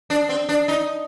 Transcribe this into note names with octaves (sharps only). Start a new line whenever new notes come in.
D4
C4
D4
D#4